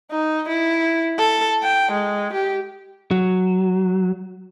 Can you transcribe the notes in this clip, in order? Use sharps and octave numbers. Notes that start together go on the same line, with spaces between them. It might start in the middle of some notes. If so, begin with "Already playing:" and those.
D#4
E4
A4
G5
G#3
G4
F#3